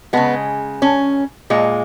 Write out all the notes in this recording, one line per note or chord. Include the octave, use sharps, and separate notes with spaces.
C#3 G#3 B3
C#4
A#2 G#3